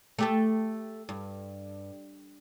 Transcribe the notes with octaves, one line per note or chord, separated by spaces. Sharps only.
A3 G4 A4
G2